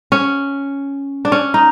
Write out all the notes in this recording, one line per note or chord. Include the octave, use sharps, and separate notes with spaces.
C#4
D4
C#4
D#4